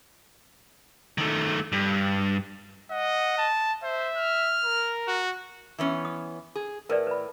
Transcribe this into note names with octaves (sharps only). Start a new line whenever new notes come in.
D#3 A3
G2
D#5 F#5
A5
C5 E5
F6
A#4
F#4
E3 B3 C#4
D#6
G#4
A2 A#4 B4 D5
B4 B5